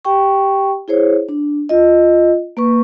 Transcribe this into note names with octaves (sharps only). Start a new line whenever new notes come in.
G4 G5 C#6
E4 G#4 C5 C#5
D4
F4 D#5
A#3 B4 C#6